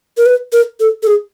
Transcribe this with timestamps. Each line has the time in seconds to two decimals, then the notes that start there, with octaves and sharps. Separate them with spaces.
0.17 A#4
0.26 B4
0.53 A#4
0.80 A4
1.03 A4
1.07 G#4